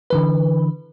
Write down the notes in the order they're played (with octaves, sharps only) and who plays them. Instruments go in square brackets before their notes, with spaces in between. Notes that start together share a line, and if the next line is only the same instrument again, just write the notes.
[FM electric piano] D3 E3 B4